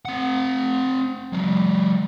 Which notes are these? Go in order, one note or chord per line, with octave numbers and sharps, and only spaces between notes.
C4 F#5
F#3 G#3